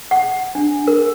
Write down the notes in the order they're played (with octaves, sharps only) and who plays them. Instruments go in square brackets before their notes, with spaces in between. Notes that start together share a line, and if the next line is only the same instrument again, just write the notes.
[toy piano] F#5
D4
A#4